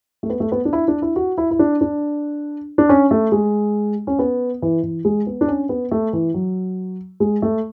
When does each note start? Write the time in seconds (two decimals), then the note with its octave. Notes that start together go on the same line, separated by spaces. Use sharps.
0.23 A3
0.30 B3
0.40 A3
0.52 B3
0.65 D4
0.73 E4
0.88 D4
1.02 E4
1.16 F#4
1.38 E4
1.51 E4
1.59 D4
1.81 D4
2.78 D4
2.89 C#4
3.11 A3
3.32 G#3
4.07 C#4
4.19 B3
4.62 E3
4.83 E3
5.05 G#3
5.27 B3
5.41 D4
5.48 C#4
5.69 B3
5.92 A3
6.13 E3
6.34 F#3
7.20 G#3
7.42 A3